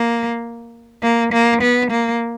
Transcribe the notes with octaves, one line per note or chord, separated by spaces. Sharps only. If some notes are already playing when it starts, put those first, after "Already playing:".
Already playing: A#3
A#3
A#3
B3
A#3